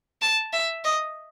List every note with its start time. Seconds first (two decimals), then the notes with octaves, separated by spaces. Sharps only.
0.21 A5
0.53 E5
0.84 D#5